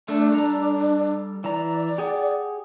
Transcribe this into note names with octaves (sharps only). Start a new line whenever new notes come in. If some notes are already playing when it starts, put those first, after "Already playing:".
A3 D4
G3 A4 A#5
E3 D5 A#5
G4 G#4 F#5